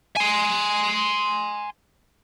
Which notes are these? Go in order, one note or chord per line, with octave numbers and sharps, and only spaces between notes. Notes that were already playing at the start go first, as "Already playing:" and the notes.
G#5 C6